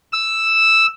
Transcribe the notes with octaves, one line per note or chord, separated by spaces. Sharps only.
E6